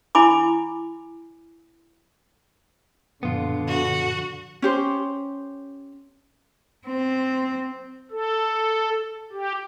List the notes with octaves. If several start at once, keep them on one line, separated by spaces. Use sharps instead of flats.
E4 G#5 B5 D6
F#2 A#2 D3 F3 B3 F4
F#4
C#4 G4 C5
C4
A4
G4